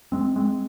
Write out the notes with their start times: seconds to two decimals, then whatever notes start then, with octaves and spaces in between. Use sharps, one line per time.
0.12 G#3 C4
0.36 G#3 C4